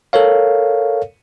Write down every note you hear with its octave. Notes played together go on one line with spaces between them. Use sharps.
A4 A#4 C#5 F5